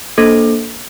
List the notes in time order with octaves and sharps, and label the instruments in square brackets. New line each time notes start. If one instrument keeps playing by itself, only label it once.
[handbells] A#3 D4 A4 C5